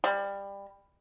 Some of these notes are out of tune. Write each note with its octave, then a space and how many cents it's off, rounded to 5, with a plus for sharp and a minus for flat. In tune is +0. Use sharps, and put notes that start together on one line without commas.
G3 +20